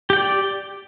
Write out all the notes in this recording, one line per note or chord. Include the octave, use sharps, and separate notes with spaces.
G4 D5 G5